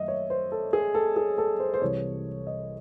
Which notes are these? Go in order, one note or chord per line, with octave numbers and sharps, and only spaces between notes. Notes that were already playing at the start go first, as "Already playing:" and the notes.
Already playing: F#2 D#3 F#3 A3 D#5 E5
C#5
C5
A4
G#4
A4
G#4
A4
C5
C5
C2 C3 E3 C#5
D#5